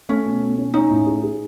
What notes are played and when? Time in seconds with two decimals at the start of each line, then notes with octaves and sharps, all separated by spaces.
0.09 A3 C#4
0.26 B2
0.42 B2
0.58 C#4
0.74 C#4 D#4
0.90 A2
1.07 G#4
1.23 G#4